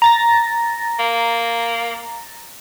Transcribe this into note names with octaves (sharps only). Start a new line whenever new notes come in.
A#5 A6 A#6
A#3